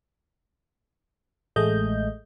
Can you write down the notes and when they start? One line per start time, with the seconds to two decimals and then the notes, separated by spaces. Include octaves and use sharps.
1.56 A1 G#3 A3 D#5 G6